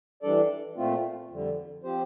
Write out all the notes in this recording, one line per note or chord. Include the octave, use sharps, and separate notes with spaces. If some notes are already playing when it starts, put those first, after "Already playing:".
E3 G3 D4 A4 D5
A#2 A3 C4 F4
F2 D3 G3
F3 C4 G4 C5